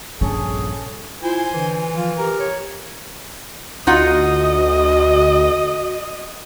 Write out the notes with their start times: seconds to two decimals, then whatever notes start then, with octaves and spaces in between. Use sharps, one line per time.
0.21 A#1 G2 C3 C#4 G#4 A4 G#5
1.23 E4 F4 C5 G#5
1.53 D3 E3
1.95 F3 F4
2.18 G4 A#4
2.40 C#5
3.87 D2 D#4 F4 F#4 D#5 F#5